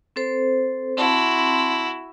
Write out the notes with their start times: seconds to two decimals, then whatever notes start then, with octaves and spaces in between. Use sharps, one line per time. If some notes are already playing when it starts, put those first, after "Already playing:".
0.16 C4 A4 C5
0.97 C4 E4 F#4 A5 C6